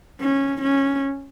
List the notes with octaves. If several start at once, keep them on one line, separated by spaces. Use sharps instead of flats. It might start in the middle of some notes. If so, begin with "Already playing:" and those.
C#4
C#4